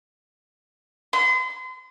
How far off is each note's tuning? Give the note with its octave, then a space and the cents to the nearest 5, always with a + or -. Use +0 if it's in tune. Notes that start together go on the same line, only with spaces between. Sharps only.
C6 -40